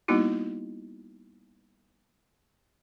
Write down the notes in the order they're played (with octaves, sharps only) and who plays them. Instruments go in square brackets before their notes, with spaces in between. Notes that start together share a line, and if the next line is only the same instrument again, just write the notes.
[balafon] G3 A#3 B3 D#4 E4 F#4